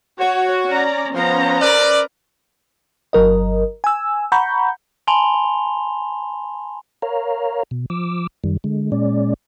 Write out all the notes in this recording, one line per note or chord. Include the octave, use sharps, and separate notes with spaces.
F#4 C#5
C#4 D5 A#5
F3 B3 C#4 C5 A#5
A#4 B4 D5
G1 F#3 A#4 D#5
G#5 E6
F#5 A#5 B5 C#6 G6
G#5 A5 B5 C6 F7 G7
A#4 C#5 F5 A#5
B2
F3 D6 E6
F#2 D#3 G3
D3 G#3
A#2 G#3 C#4 D5